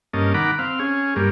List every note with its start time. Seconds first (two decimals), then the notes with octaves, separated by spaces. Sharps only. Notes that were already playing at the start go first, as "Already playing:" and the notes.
0.13 G2 A#3 C#4 D#5 A5
0.34 D#3 F#5 A#5 B5 D6
0.59 C4 F5
0.79 C#4 G#4
1.16 G2 G3 A#3